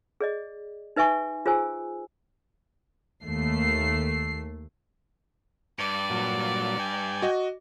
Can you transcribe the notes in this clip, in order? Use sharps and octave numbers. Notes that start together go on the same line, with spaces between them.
G#4 D5 D#5
D#4 B4 E5 G#5 C#6
F4 G#4 C5 G#5 E6
D#2 A3 C7
G2 D5
A#2 F#3
G5 G#5
F#4 D#5